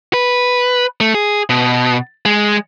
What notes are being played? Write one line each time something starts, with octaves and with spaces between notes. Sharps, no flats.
B4
A3
G#4
B2
G#3